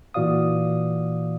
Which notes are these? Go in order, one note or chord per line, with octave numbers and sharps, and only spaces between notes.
A#2 E3 F#4 D5 F5 D#6